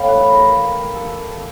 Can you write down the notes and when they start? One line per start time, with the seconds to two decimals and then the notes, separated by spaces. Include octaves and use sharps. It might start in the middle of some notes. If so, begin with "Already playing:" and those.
Already playing: A2 E3 F5 G5
0.08 B4
0.30 A#4
0.95 A4